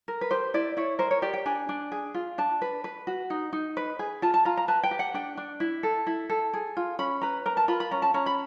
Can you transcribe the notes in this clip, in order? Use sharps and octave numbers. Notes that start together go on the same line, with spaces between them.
A#4
B4
G4 C5
E4 D5
E4 C#5
A#4 C5
C#5
G4 D5
G5
D4 G#5
D4
G#4
F4
D4 A5
B4
B4
F#4
D#4
D#4
B4
G#4
F4 A5
A5
F4 A#5
A#5
B4 A5
G5
G4
F#5
D4 G5
D4
E4
A4
E4
A4
G#4
F4
C#4 B5
B4 A#5
A#4 A#5
A5
F4 B5
B5
C#4 A#5
A5
C#4 A#5
B5